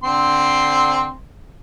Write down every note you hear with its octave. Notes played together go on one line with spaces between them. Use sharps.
D3 C4 C6